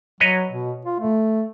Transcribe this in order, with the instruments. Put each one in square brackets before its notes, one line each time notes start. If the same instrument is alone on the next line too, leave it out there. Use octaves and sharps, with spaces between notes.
[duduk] F#3 [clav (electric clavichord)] B4 C#5 D#5
[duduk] B2
F4
A3